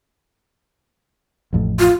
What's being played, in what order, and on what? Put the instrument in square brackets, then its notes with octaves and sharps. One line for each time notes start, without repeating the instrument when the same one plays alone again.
[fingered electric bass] A1 F2 A2
[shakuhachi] F4